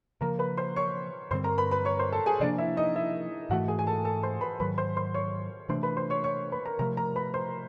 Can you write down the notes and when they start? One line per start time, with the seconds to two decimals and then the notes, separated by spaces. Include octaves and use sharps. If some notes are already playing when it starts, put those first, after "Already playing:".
0.21 C#3 F3 A#3 A#4 A#5
0.39 B4 B5
0.57 C5 C6
0.76 C#5 C#6
1.31 G2 D3 G3 C4 C5 C6
1.44 A#4 A#5
1.58 B4 B5
1.71 B4 B5
1.85 C#5 C#6
1.99 C5 C6
2.12 A4 A5
2.26 G#4 G#5
2.40 C3 F3 A#3 D4 D5
2.58 E4 E5
2.77 D#4 D#5
2.95 E4 E5
3.50 G#2 E3 A3 F#4 F#5
3.68 G#4 G#5
3.79 G#5
3.87 A4 A5
4.05 A4 A5
4.23 C5 C6
4.41 B4 B5
4.60 G#2 D#3 F#3 B4 B5
4.78 C5 C6
4.96 C5 C6
5.14 C#5 C#6
5.69 C3 E3 A3 D4 C5 C6
5.83 B4 B5
5.97 C5 C6
6.10 C#5 C#6
6.24 C#5 C#6
6.52 B4 B5
6.65 A#4 A#5
6.79 C3 F3 A3 A#4 A#5
6.97 A#4 A#5
7.16 B4 B5
7.34 C5 C6